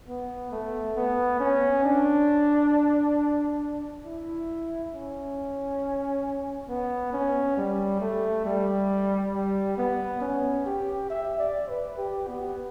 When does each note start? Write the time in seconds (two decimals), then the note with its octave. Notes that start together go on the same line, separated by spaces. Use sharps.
0.08 B3
0.52 A3
0.96 B3
1.40 C#4
1.84 D4
4.05 E4
4.93 C#4
6.69 B3
7.13 C#4
7.57 G3
8.01 A3
8.45 G3
9.34 G3
9.78 B3
10.21 C#4
10.66 G4
11.10 E5
11.39 D5
11.69 B4
11.98 G4
12.28 B3